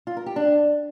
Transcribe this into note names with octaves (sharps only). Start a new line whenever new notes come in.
F4
A#4
G4
D4